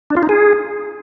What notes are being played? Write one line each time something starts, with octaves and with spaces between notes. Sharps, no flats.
D4
F4
D#4
G#4